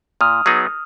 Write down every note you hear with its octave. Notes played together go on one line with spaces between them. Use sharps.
A#2 D#6 F6
F#3 B3 D#4 G#4